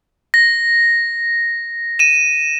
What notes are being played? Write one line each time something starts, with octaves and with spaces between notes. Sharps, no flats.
A#6
D#7 E7